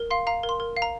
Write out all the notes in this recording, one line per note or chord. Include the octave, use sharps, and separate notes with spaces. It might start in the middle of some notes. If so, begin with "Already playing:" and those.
Already playing: A#4
F5 C6
F5 A#5
A#4
C6
A#4
F5
A#5